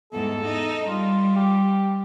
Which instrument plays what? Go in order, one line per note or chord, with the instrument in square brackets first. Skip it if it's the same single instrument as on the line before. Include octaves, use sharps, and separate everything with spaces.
[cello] E2 G#2 [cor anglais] A4
[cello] D#4
[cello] G3 [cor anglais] F4
[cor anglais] G4